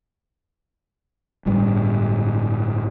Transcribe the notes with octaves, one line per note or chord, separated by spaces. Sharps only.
G1 A2 G3